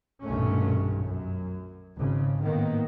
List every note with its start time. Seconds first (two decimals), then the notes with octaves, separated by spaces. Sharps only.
0.23 B1 G2 A#2 D#3 A3 C#4
1.04 F#2
1.97 G#1 C#3
2.42 A2 D#3 A#3 B3